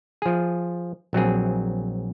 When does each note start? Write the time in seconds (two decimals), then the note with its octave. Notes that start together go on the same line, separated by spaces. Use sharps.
0.22 F3 G#4
1.13 A#1 F#3 C4 G#4